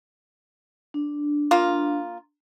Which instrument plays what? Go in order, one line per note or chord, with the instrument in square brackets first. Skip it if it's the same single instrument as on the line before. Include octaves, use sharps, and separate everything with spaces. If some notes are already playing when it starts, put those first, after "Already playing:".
[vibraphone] D4
[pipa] A#3 F4